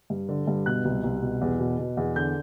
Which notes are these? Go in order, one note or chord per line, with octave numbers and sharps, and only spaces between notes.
G2
D3
G2
B2 F#6
C2
C2
B2
E2
B2
B2
E2
D3 G6